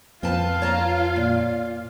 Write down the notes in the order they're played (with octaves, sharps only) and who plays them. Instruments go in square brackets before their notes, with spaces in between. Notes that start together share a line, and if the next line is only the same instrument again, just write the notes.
[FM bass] F2 [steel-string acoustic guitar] C4 B4 A5 [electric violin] F4 F5
[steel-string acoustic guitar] C#5 A5 A#5
A#2